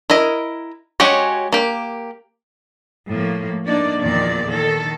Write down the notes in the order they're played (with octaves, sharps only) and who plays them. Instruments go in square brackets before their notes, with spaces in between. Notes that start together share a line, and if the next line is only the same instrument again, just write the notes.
[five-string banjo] E4 A#4 D#5
G#3 C#4 F#4 G4 C#5
A#3 G4
[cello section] A2 F3 A#3
A#3 D4 D#4 D5
E2 A#2 D#3 F3 D5
D#3 A4